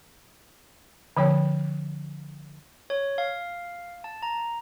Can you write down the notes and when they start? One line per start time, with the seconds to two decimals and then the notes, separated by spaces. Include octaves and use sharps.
1.17 D3 F3 C#5 G5
2.90 C#5
3.18 F5
4.04 A5
4.22 A#5